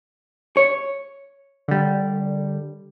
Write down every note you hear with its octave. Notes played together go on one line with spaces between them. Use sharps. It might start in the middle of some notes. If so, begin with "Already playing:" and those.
C#5
D3 G3